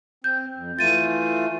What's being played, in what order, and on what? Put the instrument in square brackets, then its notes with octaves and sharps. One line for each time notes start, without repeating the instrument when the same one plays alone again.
[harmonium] C4 [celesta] G6
[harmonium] F2
[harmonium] E3 A3 F4 [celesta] A6 D#7